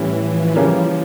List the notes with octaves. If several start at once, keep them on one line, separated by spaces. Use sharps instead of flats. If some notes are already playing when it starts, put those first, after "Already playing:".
Already playing: A2 E3 G3 C#4 E4
F3
C#3 E3 F3 G3 A#3 C#4